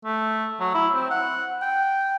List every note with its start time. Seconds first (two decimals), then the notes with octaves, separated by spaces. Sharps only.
0.05 A3
0.60 F#3
0.75 E4
0.94 C4
1.11 F#5
1.62 G5